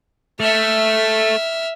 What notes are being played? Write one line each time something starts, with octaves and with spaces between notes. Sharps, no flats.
A3 E5 F6